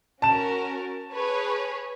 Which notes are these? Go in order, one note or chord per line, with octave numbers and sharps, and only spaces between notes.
C#4 F#4 A#4 A5 E7
G#4 B4 C#5